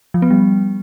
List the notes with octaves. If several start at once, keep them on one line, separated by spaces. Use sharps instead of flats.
F3
B3
G3